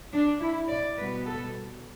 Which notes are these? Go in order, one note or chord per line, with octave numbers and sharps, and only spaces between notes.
D4
E4
D5
B2 G3 B3 B4
A4